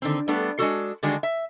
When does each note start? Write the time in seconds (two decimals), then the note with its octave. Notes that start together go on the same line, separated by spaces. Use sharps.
0.02 D3 D#3 C4
0.28 G3 A3 B3 D4 A4
0.59 G#3 D4 F4 F#4 A4
1.03 D3 D#3 G3 G#3 D4 F#4
1.23 E5